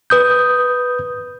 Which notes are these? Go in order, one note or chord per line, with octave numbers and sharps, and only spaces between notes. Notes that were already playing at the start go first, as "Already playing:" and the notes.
B4 D#6 G6